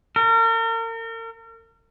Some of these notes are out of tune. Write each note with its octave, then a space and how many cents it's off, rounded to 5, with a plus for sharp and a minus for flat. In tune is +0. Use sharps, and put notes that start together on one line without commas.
A#4 -40